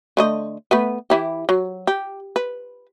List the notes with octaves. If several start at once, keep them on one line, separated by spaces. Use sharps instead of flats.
D3 A3 D#5
A3 B3 B4
E3 E4 G4
F#3
G4
B4